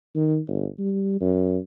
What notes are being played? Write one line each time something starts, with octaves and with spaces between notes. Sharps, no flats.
D#3
G1
G3
F#2